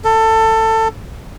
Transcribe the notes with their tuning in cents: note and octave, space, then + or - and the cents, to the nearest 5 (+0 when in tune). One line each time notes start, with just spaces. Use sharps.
A4 +20